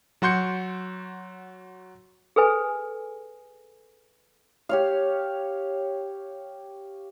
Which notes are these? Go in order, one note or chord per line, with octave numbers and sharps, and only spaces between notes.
F#3 F#4 C6 G6 C#7
G#4 A4 B4 G#5
G4 C#5 F5